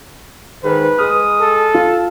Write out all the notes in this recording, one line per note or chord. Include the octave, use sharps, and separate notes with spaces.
G#2 D#3 B4
G#3 D#6 F6
A4
F4